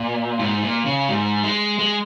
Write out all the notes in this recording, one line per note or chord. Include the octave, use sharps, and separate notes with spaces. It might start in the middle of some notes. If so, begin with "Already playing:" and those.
Already playing: A#2
G#2
A#2
C#3
G#2
G#3
G#3